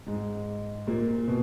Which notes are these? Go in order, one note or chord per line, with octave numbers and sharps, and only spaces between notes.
G#2 G#3
A#2 A#3
B2